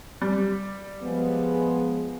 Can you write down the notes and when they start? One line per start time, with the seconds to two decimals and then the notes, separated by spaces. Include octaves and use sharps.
0.22 G3
1.02 F3 G#3 B3